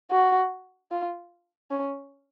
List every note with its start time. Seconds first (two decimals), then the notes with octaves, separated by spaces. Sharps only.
0.11 F#4
0.91 F4
1.70 C#4